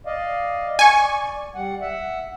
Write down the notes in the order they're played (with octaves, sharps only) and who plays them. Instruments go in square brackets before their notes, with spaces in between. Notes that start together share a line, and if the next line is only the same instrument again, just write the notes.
[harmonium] D5 D#5 F5
[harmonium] D5 [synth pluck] G#5 C#6
[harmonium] G3 F#5
E5 F#5